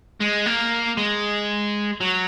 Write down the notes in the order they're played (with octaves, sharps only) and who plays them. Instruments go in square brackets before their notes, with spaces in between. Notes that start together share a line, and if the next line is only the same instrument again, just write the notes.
[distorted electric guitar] G#3
A#3
G#3
F#3